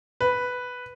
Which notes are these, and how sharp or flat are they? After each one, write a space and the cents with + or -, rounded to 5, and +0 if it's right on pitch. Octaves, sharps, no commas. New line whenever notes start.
B4 +0